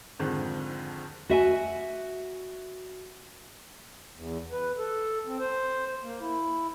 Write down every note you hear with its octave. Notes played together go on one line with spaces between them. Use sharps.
F2 G#2 D3 D#3
F#4 E5 G#5
E2
B4
A4
C4
C5
A#3
E4